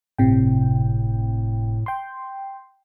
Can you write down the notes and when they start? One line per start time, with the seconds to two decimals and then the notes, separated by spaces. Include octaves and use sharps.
0.18 G1 A2 C3 G5
1.86 G5 C6